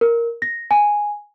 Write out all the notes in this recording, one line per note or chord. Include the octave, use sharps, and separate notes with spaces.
A#4
A#6
G#5